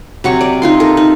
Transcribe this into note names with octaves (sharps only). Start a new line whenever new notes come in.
C3 F#3 C#6
D5
D#4 F4 C6
A4 A#4
D#4